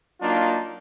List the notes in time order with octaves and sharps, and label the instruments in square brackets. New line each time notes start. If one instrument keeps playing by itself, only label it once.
[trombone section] F#3 A#3 D4 D#4 F4